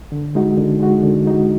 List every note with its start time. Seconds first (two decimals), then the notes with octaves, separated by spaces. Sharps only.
0.12 D3
0.35 G#3 D#4 F#4
0.57 D3
0.80 G#3 D#4 F#4
1.03 D3
1.26 G#3 D#4 F#4